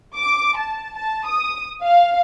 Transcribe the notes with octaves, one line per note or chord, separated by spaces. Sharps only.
D6
A5
A5
D#6
F5